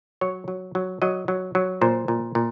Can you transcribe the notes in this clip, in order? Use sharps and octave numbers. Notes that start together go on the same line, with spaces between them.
F#3 C#5
F#3
F#3
F#3 D#5
F#3
F#3
A#2 C5
A#2
A#2